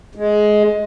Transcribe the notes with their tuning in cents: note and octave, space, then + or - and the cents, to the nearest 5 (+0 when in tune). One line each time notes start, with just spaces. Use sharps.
G#3 +15